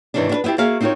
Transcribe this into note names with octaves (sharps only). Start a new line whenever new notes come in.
G#2 C3 D#3 E3 C#4 D4
D4 F#4 B4
B3 C4 E4 F4 G4
A#3 F#4 G#4 E5 F5
C4 D#4 F4 F#4 A#4 C#5